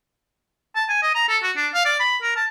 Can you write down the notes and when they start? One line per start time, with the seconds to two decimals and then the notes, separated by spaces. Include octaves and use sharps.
0.76 A5
0.89 G#5
1.03 D#5
1.15 A#5
1.29 A4
1.43 F#4
1.57 D4
1.74 F5
1.85 D5
2.00 B5
2.22 A#4
2.36 A5